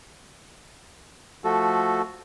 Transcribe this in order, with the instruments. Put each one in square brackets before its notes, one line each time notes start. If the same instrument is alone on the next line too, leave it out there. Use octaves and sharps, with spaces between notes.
[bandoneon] F3 A3 F#4 A4